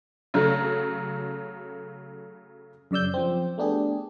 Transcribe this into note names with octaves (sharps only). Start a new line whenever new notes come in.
C#3 F#3 A3
F#2 C#3 D5 E6 G6
F3 C4
A3 B3 D4 G4 G#4